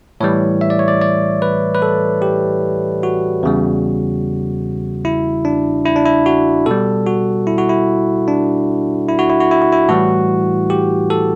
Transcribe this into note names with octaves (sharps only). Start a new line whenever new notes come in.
A2 E3 G3 C#5
E5
D5
C#5
D5
D5
B4
B4
A4
G4
F#4
E2 C#3 G3
E4
D4
E4
D4
E4
F#4
B2 G3 A4
F#4
E4
F#4
E4
D4
E4
F#4
E4
F#4
E4
F#4
E4
A2 E3 G3 F#4
G4
A4